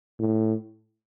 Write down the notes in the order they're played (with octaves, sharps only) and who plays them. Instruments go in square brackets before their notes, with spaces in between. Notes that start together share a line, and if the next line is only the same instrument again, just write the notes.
[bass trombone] A2